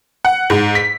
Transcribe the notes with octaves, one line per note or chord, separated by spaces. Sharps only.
F#5
G#2
B6